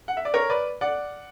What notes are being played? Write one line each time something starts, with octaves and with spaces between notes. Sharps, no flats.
F#5
E5
D5
A#4 C#5
B4 D5
D5 F#5